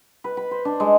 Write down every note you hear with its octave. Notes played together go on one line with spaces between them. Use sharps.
B4
B5
C5
D4
G#3